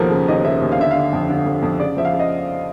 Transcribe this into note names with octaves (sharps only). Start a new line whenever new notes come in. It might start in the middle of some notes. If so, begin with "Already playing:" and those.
Already playing: D#2 B2 F3 A4 A#4
C#3
D#2 D#5
C#3 E5
D#2
F5
D3 E5
D3 F5
F2
D3
F2
F2
C#3 D5
F3 E5
F5
C#3
D#5